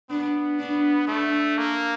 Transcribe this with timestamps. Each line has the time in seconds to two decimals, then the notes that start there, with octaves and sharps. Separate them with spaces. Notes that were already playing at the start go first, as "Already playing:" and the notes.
0.10 B3 D4
0.59 D4
1.08 A3 D4
1.58 A#3